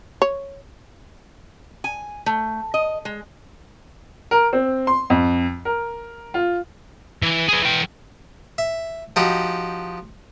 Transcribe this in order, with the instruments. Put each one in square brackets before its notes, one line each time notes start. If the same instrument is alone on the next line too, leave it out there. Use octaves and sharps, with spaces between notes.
[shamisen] C#5
[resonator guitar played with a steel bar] G#5
A3
D#5
G#3
[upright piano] A#4
C4
C6
F2
A#4
F4
[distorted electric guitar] E3
G#4 B4
E3 G5
[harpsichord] E5
F3 D#4 F#4 G4